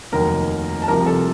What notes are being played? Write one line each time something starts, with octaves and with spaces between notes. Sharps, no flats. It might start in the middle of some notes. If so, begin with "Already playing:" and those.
F1 D#2 D#3 F#3 A#4 A#5
A5
C2 C3 F3 A#4 A#5
A4 A5